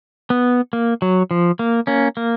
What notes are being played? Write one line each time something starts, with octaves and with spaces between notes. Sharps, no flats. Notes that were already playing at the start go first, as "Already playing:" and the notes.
B3
A#3
F#3
F3
A#3
A#3 C#4
A#3